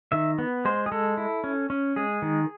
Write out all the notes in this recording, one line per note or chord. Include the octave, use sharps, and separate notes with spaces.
D#3 E5
B3
G#3 C5
G#4
G#3 A4
E4
C#4
C#4
G#3 G#4
D#3